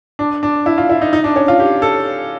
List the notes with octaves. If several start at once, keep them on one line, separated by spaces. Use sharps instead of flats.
D4
D4
E4
F4
E4
D#4
D#4
D4
C#4
F4
G4
A4